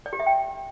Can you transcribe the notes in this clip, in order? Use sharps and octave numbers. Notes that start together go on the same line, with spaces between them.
D5
G4
E5
G5